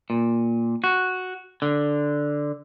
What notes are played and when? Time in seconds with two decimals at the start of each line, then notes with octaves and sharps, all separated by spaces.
0.10 A#2
0.84 F#4
1.62 D3